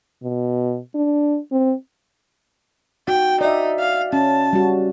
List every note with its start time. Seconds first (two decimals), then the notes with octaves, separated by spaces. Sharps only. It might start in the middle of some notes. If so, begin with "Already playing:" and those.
0.23 B2
0.95 D4
1.52 C4
3.08 D#4 F#4 G5
3.41 D#4 D5 E5
3.79 F5
4.13 C#4 A5
4.53 G3 F#4